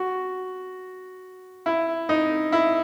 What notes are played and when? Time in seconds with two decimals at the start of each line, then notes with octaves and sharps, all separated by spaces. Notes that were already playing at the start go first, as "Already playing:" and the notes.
Already playing: F#4
1.66 E4
2.09 D#4
2.52 E4